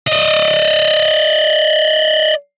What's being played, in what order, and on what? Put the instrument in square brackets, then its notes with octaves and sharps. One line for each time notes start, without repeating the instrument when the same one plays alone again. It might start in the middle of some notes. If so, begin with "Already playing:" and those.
[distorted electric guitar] D5 D#5